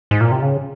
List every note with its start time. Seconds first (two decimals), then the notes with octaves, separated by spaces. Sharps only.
0.11 G#2
0.21 A#2
0.32 C3
0.42 C#3